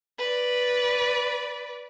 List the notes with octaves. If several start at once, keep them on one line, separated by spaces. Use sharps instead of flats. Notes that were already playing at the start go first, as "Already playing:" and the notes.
B4 D5